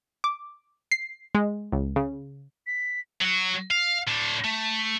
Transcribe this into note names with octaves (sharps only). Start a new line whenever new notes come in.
D6
C7
G#3
C#2
C#3
B6
F#3 F#4
F5
A2 D4
A3